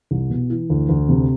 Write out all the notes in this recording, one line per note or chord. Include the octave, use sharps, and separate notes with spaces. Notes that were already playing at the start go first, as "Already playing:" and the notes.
C2
B2
E3
D2
D2
C3